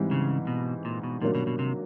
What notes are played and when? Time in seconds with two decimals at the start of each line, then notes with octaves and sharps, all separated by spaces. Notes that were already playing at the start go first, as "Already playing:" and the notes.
Already playing: G#2 E3 G3 C4
0.11 C#3
0.47 B2
0.85 A#2
1.03 B2
1.22 G2 A#2 D#3 F#3 A#3 D4
1.35 B2
1.47 B2
1.59 C3